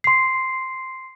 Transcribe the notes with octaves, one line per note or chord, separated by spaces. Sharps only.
C6 C7